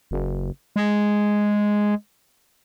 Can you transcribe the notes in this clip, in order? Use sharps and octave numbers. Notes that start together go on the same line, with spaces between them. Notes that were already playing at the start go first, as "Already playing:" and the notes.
F#1
G#3